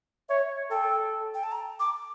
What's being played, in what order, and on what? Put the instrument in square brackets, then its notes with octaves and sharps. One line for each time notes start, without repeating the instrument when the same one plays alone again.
[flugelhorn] C#5 [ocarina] E5
[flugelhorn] A4 [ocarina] G5
[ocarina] G5
A5
A#5
D6